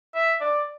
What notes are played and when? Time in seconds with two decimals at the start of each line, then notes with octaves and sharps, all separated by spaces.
0.15 E5
0.41 D5